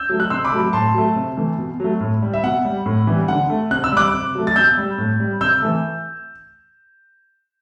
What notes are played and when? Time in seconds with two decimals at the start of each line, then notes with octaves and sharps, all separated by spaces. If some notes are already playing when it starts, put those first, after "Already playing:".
Already playing: E6 G6
0.09 F#3 A3
0.20 F#6
0.30 C3 C6 E6
0.44 B5 D6
0.52 F#3 A3
0.73 A2 A5 C6
0.94 F#3 A3
1.16 C3
1.37 E3 A3
1.58 B2
1.80 F#3 A3
2.01 A2
2.22 G3
2.34 E5
2.43 B2 F#5
2.65 G3
2.86 A2
3.07 E3 G3
3.28 D3 F#5
3.50 A3
3.71 C3 F#6
3.84 E6
3.92 G3 D6 F#6
4.13 C3
4.35 F#3 A3
4.47 A6
4.56 B2 E6 G6
4.77 G3
4.98 A2
5.20 G3
5.41 C3 E6 G6
5.62 E3 A3